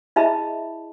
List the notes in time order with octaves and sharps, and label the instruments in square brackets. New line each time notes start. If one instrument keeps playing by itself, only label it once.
[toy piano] E4 G#4 D#5 E5 A5 B5